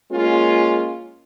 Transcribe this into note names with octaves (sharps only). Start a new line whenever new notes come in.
G#3 A#3 C#4 F4